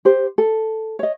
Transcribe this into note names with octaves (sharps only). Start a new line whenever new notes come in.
G4 C5
A4
C#5 D#5